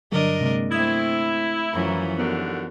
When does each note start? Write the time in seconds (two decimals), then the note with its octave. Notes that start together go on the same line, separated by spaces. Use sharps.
0.12 G2 D3 F#3 D4 A#4 D#5
0.41 C3 G#3 A#3
0.71 A3 C4 E4 D#6 G#6
1.73 F#2 E3 F3 A#5
2.18 D#2 D3 B3 F#4 A#4